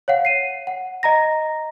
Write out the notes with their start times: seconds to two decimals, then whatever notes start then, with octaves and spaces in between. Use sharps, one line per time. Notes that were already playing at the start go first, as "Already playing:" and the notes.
0.08 C#5 F5 F#5
0.25 C7 D#7
0.67 F#5
1.03 D#5 A#5 A#6